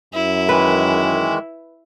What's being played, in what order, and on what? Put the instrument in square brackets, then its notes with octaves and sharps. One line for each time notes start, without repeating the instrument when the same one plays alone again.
[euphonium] F#2 [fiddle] E4
[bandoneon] D#3 E3 G#3 [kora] B4